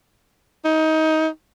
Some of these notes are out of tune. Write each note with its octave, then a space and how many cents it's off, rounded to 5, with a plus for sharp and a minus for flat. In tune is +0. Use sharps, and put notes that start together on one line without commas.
D#4 +20